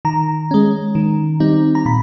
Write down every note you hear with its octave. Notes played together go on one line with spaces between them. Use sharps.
D#3 A#5
G#3 C#4
D#3
G3 C4 D#4
A#5
A#2 B5